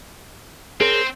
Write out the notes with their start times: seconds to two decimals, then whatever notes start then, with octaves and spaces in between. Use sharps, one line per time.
0.81 C4 G#4 A#4 C#5